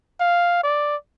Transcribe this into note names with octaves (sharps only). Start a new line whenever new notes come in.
F5
D5